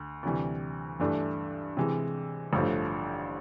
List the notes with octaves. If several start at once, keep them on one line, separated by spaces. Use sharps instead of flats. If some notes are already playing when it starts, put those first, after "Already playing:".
Already playing: D2
D2 C3 E3 G3
G2 E3 A3 D4
C3 E3 G#3
A1 G2 D3 F3 A3